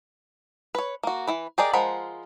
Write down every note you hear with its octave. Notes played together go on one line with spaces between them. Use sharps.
B4 C#5
A#3 F#4
E3 E4 B4
G4 G#4 A#4 D5 D#5
F3 G#3 A#4 F#5 B5